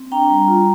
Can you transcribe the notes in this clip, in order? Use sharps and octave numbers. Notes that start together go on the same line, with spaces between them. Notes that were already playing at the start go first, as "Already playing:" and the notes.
Already playing: C4
D4 G5 A#5
G3
F4